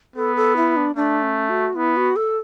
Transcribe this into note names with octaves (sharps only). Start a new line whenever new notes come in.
B3 A4
A4
E4
D4
A3 D4
C#4
F#4
B3 E4
F#4
A4